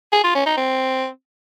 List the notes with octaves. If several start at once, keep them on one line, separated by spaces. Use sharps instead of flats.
G#4
F4
C#4
D#4
C4